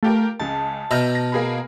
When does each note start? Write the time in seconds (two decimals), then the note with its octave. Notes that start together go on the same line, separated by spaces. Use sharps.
0.03 A3 F4 G4 A#4
0.40 C#2 C#3 A5
0.91 B2 E5 A#5 F6 G6
1.15 A#6
1.32 A#3 G#4 B5